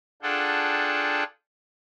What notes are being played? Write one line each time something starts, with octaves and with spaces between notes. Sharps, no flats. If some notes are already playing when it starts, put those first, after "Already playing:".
D4 F4 G#4 A4 F#5 G5